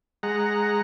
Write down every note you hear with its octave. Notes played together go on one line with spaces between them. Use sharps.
G#3 F#5 A#5